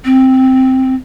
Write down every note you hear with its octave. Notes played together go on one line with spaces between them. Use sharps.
C4